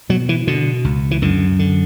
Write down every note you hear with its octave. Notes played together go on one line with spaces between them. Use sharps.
B2 F#3
E3
B2 D3
C#2
E3
F#2 D3
D3